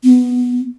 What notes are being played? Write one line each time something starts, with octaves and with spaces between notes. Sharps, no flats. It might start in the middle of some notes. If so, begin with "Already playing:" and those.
B3